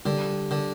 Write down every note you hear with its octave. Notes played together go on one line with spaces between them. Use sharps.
D3 G3
D3